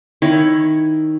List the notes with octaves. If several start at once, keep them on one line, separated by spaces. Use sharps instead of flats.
D#3 E4 C#5